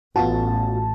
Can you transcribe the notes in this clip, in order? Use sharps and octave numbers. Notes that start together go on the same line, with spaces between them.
A1 B3 F4 F#4 A5